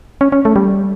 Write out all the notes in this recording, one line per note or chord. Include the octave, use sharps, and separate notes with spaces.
C#4
C#4
A3
G3